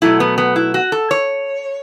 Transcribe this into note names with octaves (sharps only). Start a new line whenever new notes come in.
B2 F#3 A3 E4
B3
B3
E4
F#4
A4
C#5